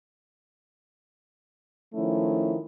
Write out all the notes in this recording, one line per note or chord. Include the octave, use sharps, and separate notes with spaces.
D#3 F3 A3 C#4 E4